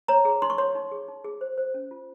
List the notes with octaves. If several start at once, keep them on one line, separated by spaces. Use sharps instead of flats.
C#5 A#5
G#4
D#4 C6
C#6
C#5 C6
D#4
G#4
D#4
G#4
C5
C5
C#4
F4